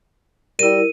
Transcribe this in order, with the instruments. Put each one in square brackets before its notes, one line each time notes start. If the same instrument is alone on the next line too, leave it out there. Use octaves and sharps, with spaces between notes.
[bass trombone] G3 [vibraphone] E4 A#4 [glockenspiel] D#7